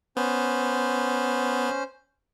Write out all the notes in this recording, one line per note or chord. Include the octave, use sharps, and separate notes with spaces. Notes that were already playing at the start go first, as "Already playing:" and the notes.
B3 C#4 C5